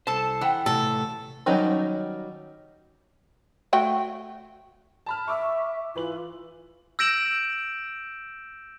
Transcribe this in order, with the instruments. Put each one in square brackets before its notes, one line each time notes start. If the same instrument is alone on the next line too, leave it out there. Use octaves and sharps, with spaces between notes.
[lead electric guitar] C2 C5 [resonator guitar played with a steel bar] A4 A5
[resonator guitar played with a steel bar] E3 [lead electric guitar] F#5 [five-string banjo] G5
[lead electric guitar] A2 C3 [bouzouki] A4
[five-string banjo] D#3 F#3 G3 C#4 D#4
[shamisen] A3 F#4 G5
[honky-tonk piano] A5 B5 F6
[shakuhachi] E5 [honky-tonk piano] C#6 D6 E6
[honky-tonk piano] E3 B4 F#7 [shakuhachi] F4
[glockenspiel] E6 G6 A#6 D7 E7 F#7